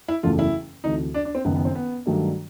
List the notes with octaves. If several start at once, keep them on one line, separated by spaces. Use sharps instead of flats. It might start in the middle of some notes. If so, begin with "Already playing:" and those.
E4
F#1 E2 C#3 E3 A3 F4
E4
D2 C3 E3 D#4
D4
D4
C4
F#1 F#2 D#3 B3
B3
C4
B3
G2 D#3 F#3 A3 D4